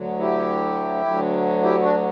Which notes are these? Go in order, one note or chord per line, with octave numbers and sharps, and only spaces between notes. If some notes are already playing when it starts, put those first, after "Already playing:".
Already playing: D2 D3 F#3
E4 G4
D2 D3 F#3
E4 G4
D4 F#4